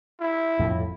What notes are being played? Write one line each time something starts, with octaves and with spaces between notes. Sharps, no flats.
E4
F2 A2